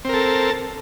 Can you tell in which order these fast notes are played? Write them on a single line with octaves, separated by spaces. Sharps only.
C4 A#4 A4